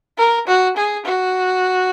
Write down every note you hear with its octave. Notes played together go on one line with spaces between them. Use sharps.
A#4
F#4
G#4
F#4